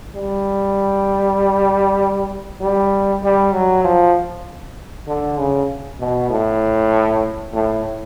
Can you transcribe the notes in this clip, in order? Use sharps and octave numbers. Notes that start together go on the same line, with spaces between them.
G3
G3
G3
F#3
F3
D3
C#3
B2
A2
A2